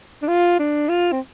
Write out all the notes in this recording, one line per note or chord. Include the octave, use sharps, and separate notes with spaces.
D4
F4
D4
F4
C4